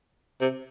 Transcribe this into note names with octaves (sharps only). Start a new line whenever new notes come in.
C3